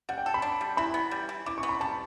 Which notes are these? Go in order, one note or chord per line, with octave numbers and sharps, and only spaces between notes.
G3 F#5
G5
A4
B5
D4
G3
E3 B5
B3
G3
E3
E3 D6
C#6
B3
B5
G3 A5